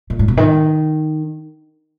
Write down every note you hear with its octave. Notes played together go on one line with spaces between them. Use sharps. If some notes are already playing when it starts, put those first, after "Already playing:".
A#2
G#2
B2
D#3